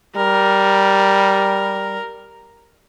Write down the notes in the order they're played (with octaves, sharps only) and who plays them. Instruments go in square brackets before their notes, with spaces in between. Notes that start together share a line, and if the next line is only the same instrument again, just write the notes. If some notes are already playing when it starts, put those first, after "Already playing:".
[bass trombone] G3 [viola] A#4